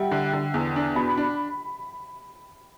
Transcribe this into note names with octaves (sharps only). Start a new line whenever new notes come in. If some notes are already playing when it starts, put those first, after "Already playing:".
Already playing: G3 E5 F#5 G5
D3
D3
E2
D4
B2 B5
D4